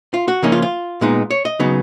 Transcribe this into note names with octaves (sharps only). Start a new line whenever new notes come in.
F4
F#4
C#3 F3 A#3 C#4 D#4
F4
F4
A#2 G#3 B3 D#4
C#5
D#5
C#3 F#3 B3 D#4